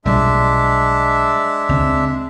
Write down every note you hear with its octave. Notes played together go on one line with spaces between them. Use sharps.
B1 A#2 G3 G#3 D4 E5
C#2 C4